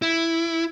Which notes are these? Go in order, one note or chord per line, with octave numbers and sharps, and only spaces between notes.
E4